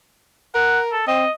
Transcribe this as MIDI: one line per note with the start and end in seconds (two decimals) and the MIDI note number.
0.55 0.95 70
0.55 0.79 78
0.92 1.07 69
1.07 1.25 60
1.07 1.31 75